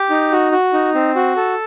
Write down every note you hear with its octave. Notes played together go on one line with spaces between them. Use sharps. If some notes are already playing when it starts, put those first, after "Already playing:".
Already playing: G4
D#4
F#4
F#4
D#4
C4
F#4
A4